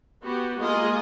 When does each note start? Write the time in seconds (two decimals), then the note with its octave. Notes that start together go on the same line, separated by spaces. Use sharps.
0.24 B3 F#4 G4
0.60 G#3 A#3 F4 G#4 D#5